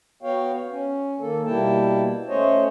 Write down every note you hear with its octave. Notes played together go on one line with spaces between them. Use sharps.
B3 F#4 C#5 F5 G5
C#4
D#3 A#3 A4
B2 G3 A#3 E4 G5 A5
A3 C#4 C5 C#5 D#5